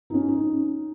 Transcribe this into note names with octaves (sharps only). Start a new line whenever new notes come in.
D#4
C#4
D#4